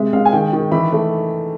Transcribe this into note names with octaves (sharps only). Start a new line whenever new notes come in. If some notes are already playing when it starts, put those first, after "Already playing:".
Already playing: C3 G#3 E5
G#3 F5
G#5
D#3 G5
D#3
E3 B5
A3